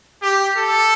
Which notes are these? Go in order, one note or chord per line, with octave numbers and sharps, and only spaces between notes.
G4
A4